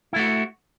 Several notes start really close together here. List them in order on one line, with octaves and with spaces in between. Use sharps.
E4 A3 F#4